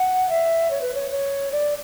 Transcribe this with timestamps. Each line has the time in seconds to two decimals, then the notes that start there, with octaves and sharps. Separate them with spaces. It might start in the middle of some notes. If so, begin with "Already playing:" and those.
Already playing: F#5
0.29 E5
0.70 C#5
0.82 B4
0.95 C#5
1.11 C#5
1.52 D5